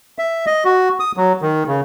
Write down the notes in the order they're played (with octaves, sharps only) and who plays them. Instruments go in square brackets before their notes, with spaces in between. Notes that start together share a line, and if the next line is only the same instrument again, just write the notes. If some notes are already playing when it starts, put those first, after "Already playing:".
[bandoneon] E5
D#5
F#4
D#6
F#3
D#3
C#3